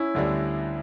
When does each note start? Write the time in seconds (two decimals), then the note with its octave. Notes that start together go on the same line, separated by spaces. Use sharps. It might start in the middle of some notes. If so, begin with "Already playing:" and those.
Already playing: C#4 E4
0.15 D2 D3 G3